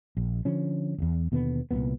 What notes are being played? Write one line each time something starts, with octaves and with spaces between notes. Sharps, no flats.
A#1
D3 F3 C#4
D#1 E2
D#2 B2 D3 B3
C2 F2 A#2 B3